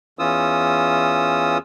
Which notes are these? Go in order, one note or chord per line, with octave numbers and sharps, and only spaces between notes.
E2 E3 C#4 F4 D#6 E6